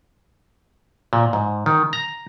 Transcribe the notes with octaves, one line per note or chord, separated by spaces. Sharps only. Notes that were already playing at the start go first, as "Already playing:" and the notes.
A#2
G#2
D#3
A#5